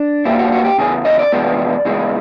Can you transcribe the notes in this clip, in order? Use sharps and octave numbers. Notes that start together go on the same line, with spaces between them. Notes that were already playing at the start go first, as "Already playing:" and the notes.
Already playing: D4
A#2 G3 C4 E4
F#4
F#4
G4
E2 C#3 E3 G#4
D#5
D5
E2 C3 F3 G#3 B3
E2 C#3 E3 G#3